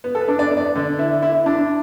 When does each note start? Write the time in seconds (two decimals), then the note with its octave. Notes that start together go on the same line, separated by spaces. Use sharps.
0.04 B3
0.15 A4
0.21 B4
0.28 D4
0.39 D5
0.51 B3
0.57 D5
0.75 D3
0.99 E4
1.22 E4
1.46 D4